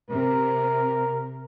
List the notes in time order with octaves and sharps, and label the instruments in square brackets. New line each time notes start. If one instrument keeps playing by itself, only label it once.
[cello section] C3 [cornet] A#4